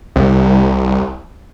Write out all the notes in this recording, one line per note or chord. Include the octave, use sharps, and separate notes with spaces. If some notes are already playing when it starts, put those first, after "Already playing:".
C2